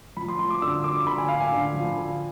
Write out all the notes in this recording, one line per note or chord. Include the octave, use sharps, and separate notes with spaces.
F3 B5
C6
F3 C6
D6
D3 E6
D3 D6
D3 B5
G#5
D3 F5
G#5
D3
F3
D3